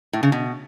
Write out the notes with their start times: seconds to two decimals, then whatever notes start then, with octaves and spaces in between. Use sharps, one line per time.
0.13 A2
0.23 C#3
0.32 B2